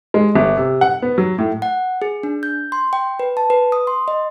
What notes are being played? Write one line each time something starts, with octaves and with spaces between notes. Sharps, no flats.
G#3
G1
C3
F#5
B3
F#3
A2
F#5
G#4
D4
G6
C6
G5
B4
A5
B4
D#6
C6
D#5